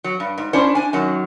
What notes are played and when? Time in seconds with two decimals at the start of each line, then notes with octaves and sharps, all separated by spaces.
0.04 F#3
0.20 G2
0.38 G#2
0.53 C#4 D4 E4 C5
0.75 D4 G#5
0.93 F#2 D#3 F#3